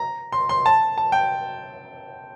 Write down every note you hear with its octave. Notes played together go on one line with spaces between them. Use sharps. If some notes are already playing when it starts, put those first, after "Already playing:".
Already playing: A#5
C6
C6
A5
A5
G5